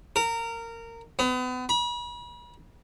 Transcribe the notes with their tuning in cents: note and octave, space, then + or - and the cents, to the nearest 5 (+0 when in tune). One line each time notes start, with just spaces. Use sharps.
A#4 -20
B3 +35
B5 -40